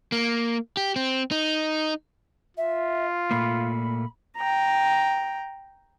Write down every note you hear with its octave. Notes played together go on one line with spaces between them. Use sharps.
A#3
G4
C4
D#4
F4 E5
A#2 A3 A#3 B5
G5 A#5